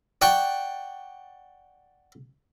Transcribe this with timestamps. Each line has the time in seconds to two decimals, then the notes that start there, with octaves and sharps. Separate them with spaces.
0.22 D5 F#5 G5 A5 C#6